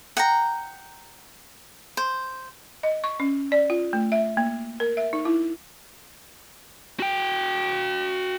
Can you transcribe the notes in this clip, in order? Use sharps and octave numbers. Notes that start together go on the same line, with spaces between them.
F#5 G5 A#5
C5
D#5
C#6
C#4
D5
F4
A3
E5
A#3
A#4
E5
D#4
E4
F#4 G5